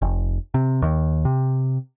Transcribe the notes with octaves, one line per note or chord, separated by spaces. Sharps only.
F1
C3
D#2
C3